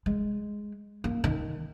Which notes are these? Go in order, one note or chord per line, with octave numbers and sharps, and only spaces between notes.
G#3
A#3
D#3